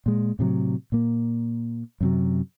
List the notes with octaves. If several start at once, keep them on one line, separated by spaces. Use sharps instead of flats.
A#2 G#3
A2 C3 F3 F#3
A#2 A#3
F#2 C3 F#3